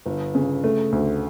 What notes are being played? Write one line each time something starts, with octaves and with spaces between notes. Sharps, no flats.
G1
C#3
A3
D2